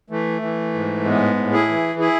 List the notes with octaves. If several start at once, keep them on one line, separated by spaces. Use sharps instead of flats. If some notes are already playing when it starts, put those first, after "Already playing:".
E3 A3
E3
G#2
A2 G#3 B3
A2
E4 G#4
E3
E4 G#4